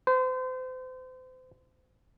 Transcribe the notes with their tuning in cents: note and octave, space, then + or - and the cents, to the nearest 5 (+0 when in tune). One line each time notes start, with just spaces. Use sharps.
C5 -35